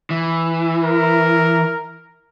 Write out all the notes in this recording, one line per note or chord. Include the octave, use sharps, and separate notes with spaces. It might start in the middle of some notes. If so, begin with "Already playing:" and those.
E3
A#4